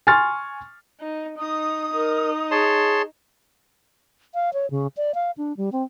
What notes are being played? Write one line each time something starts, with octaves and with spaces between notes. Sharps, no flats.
G#5 C6 C#6 F6 A6
D#4
D#4 D#6
D#4 A#4
G#4 C#5 A5 C6
F5
C#5
C#3
D5
F5
D4
G3
C4